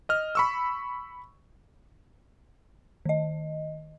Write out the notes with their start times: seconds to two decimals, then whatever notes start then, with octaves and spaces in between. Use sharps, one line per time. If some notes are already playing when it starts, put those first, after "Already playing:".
0.09 D#5 F6
0.35 B5 C#6 E6
3.05 D#3 D#5